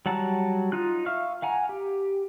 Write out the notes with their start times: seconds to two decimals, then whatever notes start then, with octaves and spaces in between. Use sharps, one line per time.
0.06 F#3 G3 F#5 A5 A#5
0.72 D#4 F4 F#6
1.06 E5 F5 C#6 F6
1.42 F5 F#5 G#5 A#5
1.69 G4